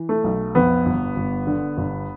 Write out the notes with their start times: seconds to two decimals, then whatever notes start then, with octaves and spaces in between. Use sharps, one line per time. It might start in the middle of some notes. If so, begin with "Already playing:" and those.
Already playing: E3
0.09 A3
0.24 B1
0.55 F2 B3
0.86 G1
1.16 G1
1.47 D3
1.77 G1